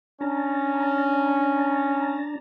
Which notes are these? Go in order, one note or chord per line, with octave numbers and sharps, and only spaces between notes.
C#4 D4 A5 A#5